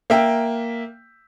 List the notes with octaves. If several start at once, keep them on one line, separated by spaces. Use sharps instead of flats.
A#3 E5 G5